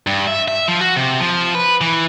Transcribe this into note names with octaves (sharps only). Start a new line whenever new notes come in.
G2
E5
E5
F3
F#4
C3
F3
B4
E3